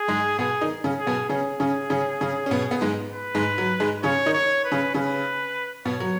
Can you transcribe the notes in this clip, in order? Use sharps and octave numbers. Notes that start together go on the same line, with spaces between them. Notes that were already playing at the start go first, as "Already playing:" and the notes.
Already playing: G#4
G#2 G#3
B2 B3 G#4
D#3 D#4
C#3 C#4
G#4
B2 B3
C#3 C#4 G#4
C#3 C#4
C#3 C#4
C#3 C#4
C#4
B2 B3
B3
G#2 G#3
B4
G#2 G#3
F#3
G#2 G#3
C#3 C#4 C#5
D#3 D#4
C#5
B4
C#3 C#4
C#3 C#4 B4
B2 B3 C#5
F#3